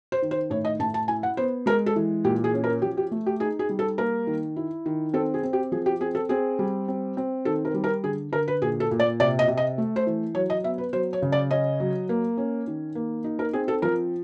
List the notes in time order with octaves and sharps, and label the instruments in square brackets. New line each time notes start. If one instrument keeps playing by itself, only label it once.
[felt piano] C5
D#3
C5
A2 C#5
D#5
A2 A5
A5
E4 G#5
F#5
B3 C5
G#3 A#4
A4
E3
A#2 G4
G#4
C#4
A#4
F3 G4
G4
A3
G4
D#4 G#4
G#4
G3
A4
A#3 A#4
D#3
E4
D#3
C4 A4
G#4
C4
G4
F3 G#4
G4
C4 G#4
A4
C4 G#4
G3
C4
C4
D#3 A4
A#4
G3
A#4
D3 G#4
D3 A#4
B4
A#2 G#4
A4
A#2
D5
C3 D5
D#5
C3
D#5
A3
C5
E3
F#3 C#5
D#5
B3 E5
B4
F#3 C5
C#5
C#3
D5
C#4 D#5
F#3
A#3
C#4
D#3
A#3
D#4
A#4
C4 G#4
A4
F3 A#4